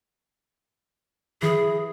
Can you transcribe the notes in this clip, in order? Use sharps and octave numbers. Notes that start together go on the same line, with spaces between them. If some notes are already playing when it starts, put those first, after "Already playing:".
E3 G#4 A#6